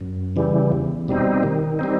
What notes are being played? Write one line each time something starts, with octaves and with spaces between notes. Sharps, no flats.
F#2
C#3 E3 G3
E2
B2 G3 C4 D#4
D#3
G3 C4 D#4